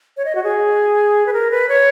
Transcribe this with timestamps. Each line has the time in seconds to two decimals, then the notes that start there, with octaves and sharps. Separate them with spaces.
0.17 C#5
0.25 D#5
0.35 F#4
0.44 G#4
1.26 B4
1.33 A#4
1.51 B4
1.69 C#5